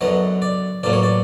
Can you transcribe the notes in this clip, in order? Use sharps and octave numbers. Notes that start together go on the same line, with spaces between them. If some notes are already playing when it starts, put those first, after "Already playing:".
F#2 D3 F#3 B3 D#5
D5
A1 A2 F#3 A#3 D5
C#5
D5